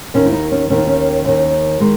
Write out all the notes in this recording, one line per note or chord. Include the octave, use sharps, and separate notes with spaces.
D#2 D#3 C#4
E4
D#4
C#4
D#2 D#3 C#4
D#4
C#4
D#2 D#3
D#3 G#3